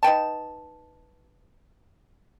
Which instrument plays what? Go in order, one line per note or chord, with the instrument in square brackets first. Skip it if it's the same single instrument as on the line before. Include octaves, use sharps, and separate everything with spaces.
[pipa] D#4 B4 G5 A5